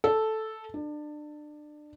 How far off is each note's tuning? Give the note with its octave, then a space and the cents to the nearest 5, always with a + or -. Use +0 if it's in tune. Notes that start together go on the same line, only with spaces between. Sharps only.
A4 -5
D4 +30